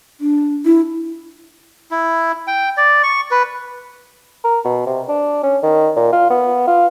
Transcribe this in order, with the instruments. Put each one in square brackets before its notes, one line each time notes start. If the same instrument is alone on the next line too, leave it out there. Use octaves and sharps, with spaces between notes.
[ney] D4
E4
[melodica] E4
G5
D5
C#6
B4
[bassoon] A#4
B2
C3
D4
C#4
D#3
A#2
F4
B3
F4